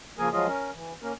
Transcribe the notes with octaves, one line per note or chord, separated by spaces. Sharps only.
C#3 F3 A#3 G#4 A#4 G#5
F3 F#3 G#3 F4 G#4 D#5
C#4 A#4
E3
A#3 C#4 A#4